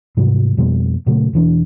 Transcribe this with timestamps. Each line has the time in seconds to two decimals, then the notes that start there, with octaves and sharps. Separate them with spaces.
0.17 G#2 C3 F#3 G3
0.57 F2 B2 G3
1.06 A#2 C#3 F#3 A3
1.33 E1 E3 D4